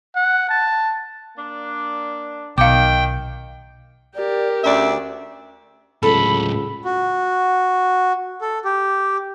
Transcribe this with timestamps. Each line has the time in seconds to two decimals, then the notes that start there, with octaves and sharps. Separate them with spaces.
0.16 F#5
0.49 A5
1.37 A#3 D4
2.58 B1 D#3 F5 G5 D6
4.15 G4 A#4 D5
4.63 D2 C#4 D4 D5 E5
6.03 C#2 A2 F#3 A4 B5
6.85 F#4
8.41 A4
8.65 G4